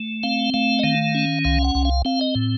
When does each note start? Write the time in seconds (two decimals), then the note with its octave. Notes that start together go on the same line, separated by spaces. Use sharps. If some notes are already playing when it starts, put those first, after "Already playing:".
Already playing: A3
0.23 C4 F5
0.54 A3 F5
0.79 D#5
0.84 D#3 F5
1.15 C#4
1.45 C2 F5
1.64 F#5
1.75 C2
1.85 F5
2.05 C4 F5
2.21 D#5
2.35 A2